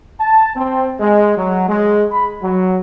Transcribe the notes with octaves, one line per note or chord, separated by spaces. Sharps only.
A5
C4
G#3
F#3
G#3
B5
F#3